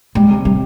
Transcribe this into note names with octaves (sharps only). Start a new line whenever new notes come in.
G3 G#3
C3
C3 G3